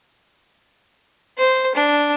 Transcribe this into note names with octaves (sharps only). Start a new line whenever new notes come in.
C5
D4